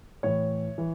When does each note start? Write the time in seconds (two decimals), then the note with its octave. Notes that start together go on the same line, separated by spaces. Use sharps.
0.23 A2 E3 C#5
0.78 E3